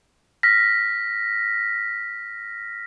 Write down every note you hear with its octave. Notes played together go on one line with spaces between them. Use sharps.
F6 A#6 B6